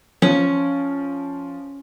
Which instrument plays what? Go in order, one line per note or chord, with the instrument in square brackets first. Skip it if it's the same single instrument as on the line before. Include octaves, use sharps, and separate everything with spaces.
[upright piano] F3 [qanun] C#4